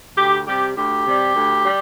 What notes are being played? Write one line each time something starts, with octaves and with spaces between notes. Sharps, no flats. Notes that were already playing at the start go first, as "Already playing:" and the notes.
D2 G4
C3 G3 G4
D2 G4
C3 G3
D2
G3